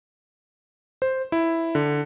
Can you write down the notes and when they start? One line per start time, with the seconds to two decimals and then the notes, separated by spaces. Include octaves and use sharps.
1.02 C5
1.32 E4
1.75 D3